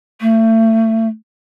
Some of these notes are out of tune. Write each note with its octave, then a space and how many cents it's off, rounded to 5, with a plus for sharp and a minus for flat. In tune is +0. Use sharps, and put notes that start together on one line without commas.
A3 +30